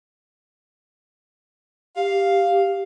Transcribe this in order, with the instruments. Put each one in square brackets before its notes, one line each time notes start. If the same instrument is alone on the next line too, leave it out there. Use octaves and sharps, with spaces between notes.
[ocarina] G4 [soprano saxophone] F5